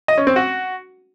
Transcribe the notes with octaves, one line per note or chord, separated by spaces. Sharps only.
D#5
C#4
C4
F#4